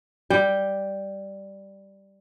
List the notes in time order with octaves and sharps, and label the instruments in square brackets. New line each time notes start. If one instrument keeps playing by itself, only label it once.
[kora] G3 G5